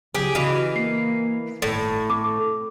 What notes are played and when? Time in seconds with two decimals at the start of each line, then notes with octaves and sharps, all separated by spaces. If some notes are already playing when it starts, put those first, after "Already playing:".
0.15 C#3 F#3 E4 G4 G#4
0.35 C#3 E3 F#4 D#5 F5
0.76 A#3 C7
1.62 G1 A2 D#3 A4
2.10 C4 A4 D6